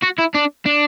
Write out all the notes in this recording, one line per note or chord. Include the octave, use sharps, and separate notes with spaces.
F#4
E4
D4
D4